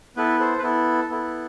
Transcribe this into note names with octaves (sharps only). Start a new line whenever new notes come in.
B3 E4 A4 B4
A4 C5
B4
B3 E4 A4
B3 E4 A4